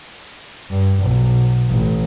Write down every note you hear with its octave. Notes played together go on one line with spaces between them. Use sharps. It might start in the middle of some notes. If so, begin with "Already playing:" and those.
G2
B1
A1